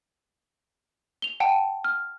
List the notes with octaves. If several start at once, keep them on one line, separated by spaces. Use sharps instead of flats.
F7 G7
F#5 G5 A5
F6